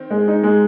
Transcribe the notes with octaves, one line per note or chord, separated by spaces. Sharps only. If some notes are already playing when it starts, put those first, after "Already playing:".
Already playing: D#3 C4
G#3
D#4
G#3